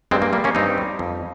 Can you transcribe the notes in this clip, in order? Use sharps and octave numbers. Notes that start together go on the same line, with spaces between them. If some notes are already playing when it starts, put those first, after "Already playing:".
G2 G#3 C4
A#3
G3 A#3
A#3 C#4
G2 C4 D#4
G3
F2